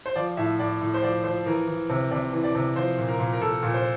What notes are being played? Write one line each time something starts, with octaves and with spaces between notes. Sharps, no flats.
C5
F3 D5
A2 E5
A2 D5
A2
C5
F3 D5
F3 C5
E3 A#4
E3
C3
C3 D5
E3
D5
C3
F3 C5
A#2
A#4
A#2
A#4
A#2 A4
A#2
C5